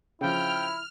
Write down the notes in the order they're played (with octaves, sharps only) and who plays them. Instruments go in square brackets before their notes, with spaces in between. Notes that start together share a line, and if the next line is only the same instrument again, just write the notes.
[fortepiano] C#3 F3 [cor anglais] E4 [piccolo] G5 [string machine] F6